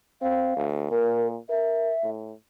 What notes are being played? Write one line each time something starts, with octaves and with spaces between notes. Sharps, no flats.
C4 F5
D2
A#2 A#4
A#4 E5
A2